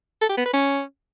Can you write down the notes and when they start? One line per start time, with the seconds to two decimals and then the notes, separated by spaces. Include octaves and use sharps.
0.21 A4
0.29 G4
0.37 B3
0.45 B4
0.53 C#4